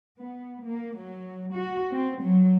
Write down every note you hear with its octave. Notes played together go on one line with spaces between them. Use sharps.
B3
A#3
F#3
F#4
C4
F#3